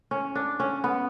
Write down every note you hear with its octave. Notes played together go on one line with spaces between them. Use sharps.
C#4
D4
C#4
B3